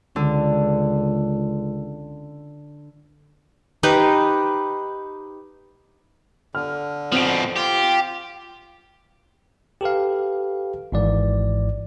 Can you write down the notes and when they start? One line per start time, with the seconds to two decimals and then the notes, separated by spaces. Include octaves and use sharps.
0.16 C#2 D3
3.83 D#4 G4 B4 C5
6.55 D3 F6
7.12 B2 F3 C4 D7
7.56 F4 G4
9.81 G4 A4 B4 F5
10.92 G#1 G#2 E3 D5